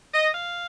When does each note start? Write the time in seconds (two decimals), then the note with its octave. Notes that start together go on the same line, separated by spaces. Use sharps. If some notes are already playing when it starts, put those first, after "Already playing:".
0.14 D#5
0.34 F5